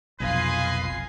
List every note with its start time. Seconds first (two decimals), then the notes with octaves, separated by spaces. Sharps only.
0.20 F1 B1 F4 B4 D#5 G#5 C7